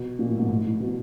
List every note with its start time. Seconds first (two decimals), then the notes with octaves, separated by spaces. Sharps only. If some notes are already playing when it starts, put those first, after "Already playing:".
Already playing: B2
0.19 A#2
0.29 A2
0.39 G#2
0.49 A2
0.65 A2
0.80 B2